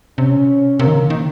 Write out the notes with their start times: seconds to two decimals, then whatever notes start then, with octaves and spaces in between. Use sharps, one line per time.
0.18 C3 C#4
0.79 C3 A#3
0.87 D#3
0.95 C#3
1.10 D#3